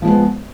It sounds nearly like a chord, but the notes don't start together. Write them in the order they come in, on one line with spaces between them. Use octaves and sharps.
F3 G#3 B3